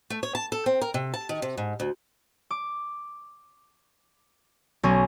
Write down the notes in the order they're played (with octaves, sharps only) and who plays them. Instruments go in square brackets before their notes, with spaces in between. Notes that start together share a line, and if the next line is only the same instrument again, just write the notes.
[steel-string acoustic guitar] A3
C#5
A5
A4
C4
A#4
C3
A5
D#3
C3
G#2
D2
[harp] D6
B1 C#4 G#5 A#5